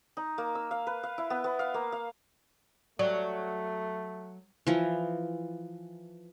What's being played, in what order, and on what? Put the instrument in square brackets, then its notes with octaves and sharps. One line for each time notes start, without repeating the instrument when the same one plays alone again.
[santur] D#4
A#3
E6
F5
B4
F5
E4
B3
B3
F5
A#3
F5
[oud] F#3 [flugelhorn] A3 [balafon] D5
[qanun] E3 F3